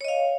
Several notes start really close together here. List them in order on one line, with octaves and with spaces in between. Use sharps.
C#5 D#5 F5